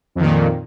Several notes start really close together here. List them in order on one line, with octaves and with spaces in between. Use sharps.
F2 D#3 A#2